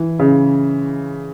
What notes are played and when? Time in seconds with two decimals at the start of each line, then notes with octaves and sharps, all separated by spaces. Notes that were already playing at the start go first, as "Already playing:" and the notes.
Already playing: E3
0.19 C#3